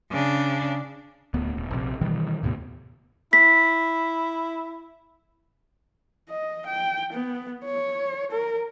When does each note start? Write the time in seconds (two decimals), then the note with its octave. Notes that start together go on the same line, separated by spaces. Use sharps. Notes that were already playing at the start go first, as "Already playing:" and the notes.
0.11 C#3 D4
1.34 D1 D2 B3
1.57 D#1
1.71 A#1 C3
2.01 B2 D#3 E3 G3
2.43 D#2 A2 C3 B3
3.33 E4 B6
6.29 D#5
6.66 G5
7.13 B3
7.65 C#5
8.31 A#4